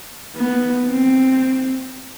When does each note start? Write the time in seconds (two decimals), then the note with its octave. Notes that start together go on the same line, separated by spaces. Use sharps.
0.36 B3
0.88 C4